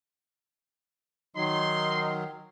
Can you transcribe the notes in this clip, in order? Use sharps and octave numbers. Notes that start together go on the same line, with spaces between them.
D#3 F#3 D#4 C6